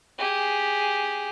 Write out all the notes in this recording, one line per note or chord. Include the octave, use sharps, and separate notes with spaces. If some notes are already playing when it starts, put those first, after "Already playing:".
G4 G#4